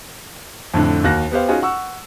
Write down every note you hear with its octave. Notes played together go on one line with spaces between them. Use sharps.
F2 A2 D3
D#2 F#4 F#6 A#6
B3 G4 C5 F5
C#4 D#4 F4 F#4 G#4
F#5 C#6 E6